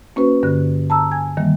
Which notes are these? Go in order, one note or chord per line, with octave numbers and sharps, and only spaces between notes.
A#3 C#4 F#4 B4 C5
G2 D3 F#6
A5 A#5 E6
G#5 G#6
D#3 E3 G3 A#3